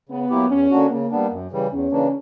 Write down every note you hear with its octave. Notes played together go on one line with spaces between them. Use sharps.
C#3 B3
F#3 A#3 E4 G4
E2 C#4
D3 A#3 D4 F#4
C#3 A#3
G3 B3 D4
F#2
C#3 E3 G3
E2 C#4
C#3 E3 A#3 D4